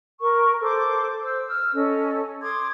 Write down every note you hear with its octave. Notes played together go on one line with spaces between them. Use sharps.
A#4 C#6
A4 C5 C6 D6
C5 E6
E6 F6
C#4 A4 D#5
C6 D6 D#6 G#6